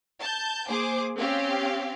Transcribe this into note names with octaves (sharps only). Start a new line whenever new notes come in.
A5 G6
A#3 G#4 C5 D6
C4 C#4 G4 F5